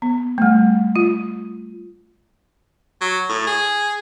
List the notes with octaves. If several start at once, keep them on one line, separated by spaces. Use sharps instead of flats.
B3
G3 A3
F4
F#3
A2
G#4